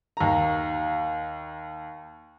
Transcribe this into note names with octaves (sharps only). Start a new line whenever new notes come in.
D#2 A#5